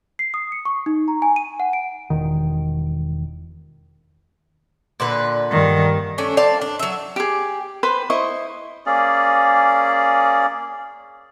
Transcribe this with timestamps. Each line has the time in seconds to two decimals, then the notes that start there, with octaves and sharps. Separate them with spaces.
0.19 C7
0.34 D#6
0.52 C#7
0.65 C#6
0.86 D#4
1.08 A#5
1.22 G#5
1.36 D#7
1.60 F#5
1.73 D7
2.10 E1 D#3
5.00 A#2 D3 B4
5.51 G2 D#3
6.18 A3 C#4 D4
6.37 C4 D5 F5 A5
6.61 D4
6.79 F#3 E5
7.16 G4 G#4
7.83 B4 C5 G5 B5
8.10 E4 C5 D#5 C#6
8.86 A#3 C#4 G#4 D5